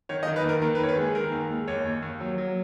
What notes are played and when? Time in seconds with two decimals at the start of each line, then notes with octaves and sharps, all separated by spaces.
0.09 D#3 C#5
0.23 D#5
0.27 D#3
0.36 B4
0.44 D#2 A#4
0.62 D#3 A#4
0.75 B4
0.80 D#2 C#5
0.89 B4
0.97 G#3 G#4
1.15 D#3 A#4
1.32 D#2
1.50 G#3
1.68 D#2 C#5
1.85 D#2
2.02 D#2
2.20 F#3
2.38 F#3